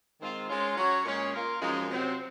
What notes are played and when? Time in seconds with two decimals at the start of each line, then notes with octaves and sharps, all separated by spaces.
0.20 D#3 G#3 C4 F4
0.49 G#3 C#4 F4
0.77 F#3 C#4 F#4 C#5
1.05 A#2 G#3 C#4 G#4 C#5
1.33 A#3 F4 A#4
1.61 F#2 F3 G#3 D#4
1.89 C3 F#3 C4